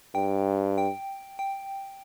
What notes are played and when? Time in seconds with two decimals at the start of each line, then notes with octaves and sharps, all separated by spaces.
0.15 G2 G5
0.78 G5
1.39 G5